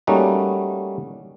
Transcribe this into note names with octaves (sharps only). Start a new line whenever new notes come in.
G3 A3 A#3 C#4 D#4 F#4